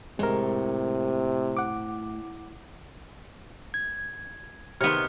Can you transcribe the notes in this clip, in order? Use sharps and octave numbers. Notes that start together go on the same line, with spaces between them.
A2 C3 G#3 A#4
F#5 D6
G#6
C3 D#3 B3 C4 C#5 F6